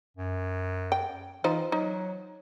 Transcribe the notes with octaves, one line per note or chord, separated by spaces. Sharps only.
F#2
G5
E3 D#4 F4 C5
F#3 D#4